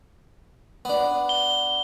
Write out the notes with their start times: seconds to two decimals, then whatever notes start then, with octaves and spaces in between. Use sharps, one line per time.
0.85 B3 D4
1.29 G7